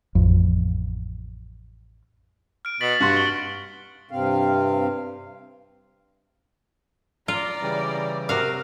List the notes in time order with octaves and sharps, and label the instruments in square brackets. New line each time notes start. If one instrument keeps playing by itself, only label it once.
[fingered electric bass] A1 F2
[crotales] F6 D7
[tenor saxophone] B2 [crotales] A6 B6 F#7
[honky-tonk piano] G2 C6 [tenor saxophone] F#4
[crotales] G7
[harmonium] G2 C3 C4 F5
[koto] F4 [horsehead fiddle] D5 A#5
[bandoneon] C#3 E3 G3
[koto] C3 F#4 F5 [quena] A#4